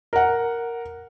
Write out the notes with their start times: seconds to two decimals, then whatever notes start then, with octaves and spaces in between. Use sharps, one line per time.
0.13 A#4 F#5